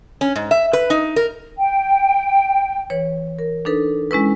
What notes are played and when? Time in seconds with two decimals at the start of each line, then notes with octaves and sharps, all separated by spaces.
0.21 C#4
0.36 G#2
0.51 E5
0.73 B4
0.90 D#4
1.16 A#4
1.57 G5
2.90 E3 B4 C#5
3.39 A#4
3.65 D4 D#4 A4 B4
4.11 G#3 C#4 E4 B4